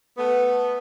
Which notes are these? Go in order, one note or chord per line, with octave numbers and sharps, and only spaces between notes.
A3 B3